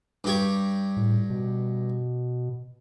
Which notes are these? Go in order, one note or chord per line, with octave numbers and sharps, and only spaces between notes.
G2 G4 C#5
A2
B2